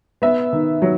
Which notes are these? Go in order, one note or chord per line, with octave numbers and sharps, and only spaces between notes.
B3 E5
D#3
F#3